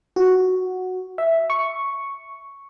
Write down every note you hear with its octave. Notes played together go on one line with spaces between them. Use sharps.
F#4
E5
C#6